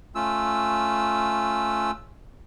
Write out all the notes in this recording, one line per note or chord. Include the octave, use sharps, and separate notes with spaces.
A3 C#4 F4 E6